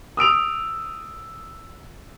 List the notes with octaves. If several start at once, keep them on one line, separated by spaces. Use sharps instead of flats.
D#6 E6 D7 F7